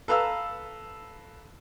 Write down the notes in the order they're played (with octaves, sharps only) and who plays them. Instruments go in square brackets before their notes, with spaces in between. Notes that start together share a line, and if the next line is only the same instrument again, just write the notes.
[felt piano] A4 B4 F5 A#5 E6